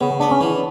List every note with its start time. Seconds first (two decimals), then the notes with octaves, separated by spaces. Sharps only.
0.01 C#3 B3
0.20 B3 D4
0.31 C#4
0.41 E3